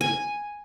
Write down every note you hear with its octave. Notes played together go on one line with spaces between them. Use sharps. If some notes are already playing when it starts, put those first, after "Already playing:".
G#5